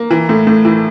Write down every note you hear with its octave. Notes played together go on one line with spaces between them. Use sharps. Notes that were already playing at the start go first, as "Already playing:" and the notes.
Already playing: A#3
E3
A2
A2
E3